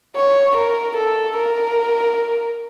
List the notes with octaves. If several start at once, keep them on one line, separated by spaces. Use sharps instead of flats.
C#5
A#4
A4
A#4